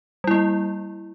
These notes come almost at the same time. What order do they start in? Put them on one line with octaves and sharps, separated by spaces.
G3 E4 A#3